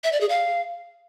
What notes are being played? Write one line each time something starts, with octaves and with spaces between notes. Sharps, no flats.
E5
D5
G#4
F5